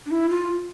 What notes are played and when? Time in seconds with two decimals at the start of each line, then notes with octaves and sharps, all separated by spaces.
0.06 D4
0.11 E4
0.30 F4